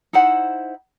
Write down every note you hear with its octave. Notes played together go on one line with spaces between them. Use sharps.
D#4 E4 C5 F#5